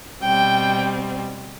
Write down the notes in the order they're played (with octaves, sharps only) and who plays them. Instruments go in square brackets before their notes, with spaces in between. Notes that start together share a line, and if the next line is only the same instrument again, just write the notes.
[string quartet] B2 G3 C4 G5